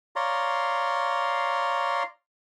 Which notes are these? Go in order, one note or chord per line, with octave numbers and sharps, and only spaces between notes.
C#5 D5 F5 A#5 C6